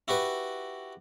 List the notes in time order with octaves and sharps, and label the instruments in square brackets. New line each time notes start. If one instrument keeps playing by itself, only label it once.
[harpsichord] E4 F#4 G4 B4